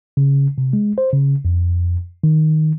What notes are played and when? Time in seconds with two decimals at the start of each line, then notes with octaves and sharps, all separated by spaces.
0.17 C#3
0.58 C3
0.73 G#3
0.98 C5
1.13 C#3
1.45 F2
2.24 D#3